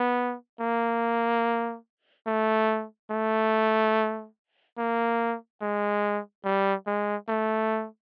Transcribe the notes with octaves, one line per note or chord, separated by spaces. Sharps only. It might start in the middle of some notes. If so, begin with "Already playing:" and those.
Already playing: B3
A#3
A3
A3
A#3
G#3
G3
G#3
A3